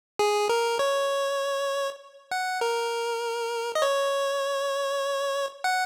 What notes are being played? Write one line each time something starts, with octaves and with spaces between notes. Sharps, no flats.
G#4
A#4
C#5
F#5
A#4
D#5
C#5
F#5